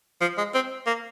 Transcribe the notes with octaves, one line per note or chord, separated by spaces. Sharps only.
F3
G#3
C4
A#3